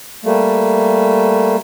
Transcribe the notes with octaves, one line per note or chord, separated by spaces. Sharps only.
G3 A3 A#3